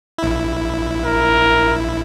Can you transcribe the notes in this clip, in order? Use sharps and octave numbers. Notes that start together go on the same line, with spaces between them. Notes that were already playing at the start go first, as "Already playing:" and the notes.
A#1 E4
A#4